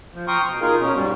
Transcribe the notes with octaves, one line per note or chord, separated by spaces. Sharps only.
F3
G5 A#5 C6 C#6 D#6 F6
B2
D#4 F4 G#4 A#4
B2 C#4
G#2 G3